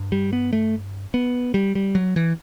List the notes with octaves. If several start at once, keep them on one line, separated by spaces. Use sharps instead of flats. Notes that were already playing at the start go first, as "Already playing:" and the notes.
Already playing: G2
G3
B3
A3
B3
G3
G3
F#3
E3